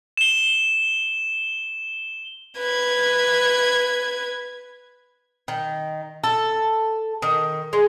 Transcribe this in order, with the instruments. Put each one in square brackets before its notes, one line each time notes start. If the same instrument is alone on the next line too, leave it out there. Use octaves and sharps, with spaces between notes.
[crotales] E7 G7
[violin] B4 G#6
[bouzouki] D#3
A4
D#3
G#3